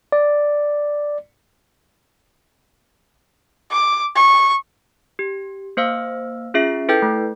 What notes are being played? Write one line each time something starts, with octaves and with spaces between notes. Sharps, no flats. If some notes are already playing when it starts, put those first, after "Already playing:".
D5
D6
C#6
G4
A#3 C5 F5 E6
C#4 F4 G#4 E5 C7
E4 A4 B4 G5 G6
A3